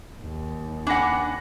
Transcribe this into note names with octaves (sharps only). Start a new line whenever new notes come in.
D#2
D4 F#5 G#5 B5 A#6